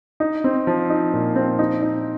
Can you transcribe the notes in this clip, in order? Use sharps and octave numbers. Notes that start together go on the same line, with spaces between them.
D#4
C4
F3
D#4
A#2
C4
D#4
D#4